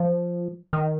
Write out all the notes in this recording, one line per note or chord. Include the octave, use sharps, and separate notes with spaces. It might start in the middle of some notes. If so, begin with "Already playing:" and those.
Already playing: F3
D#3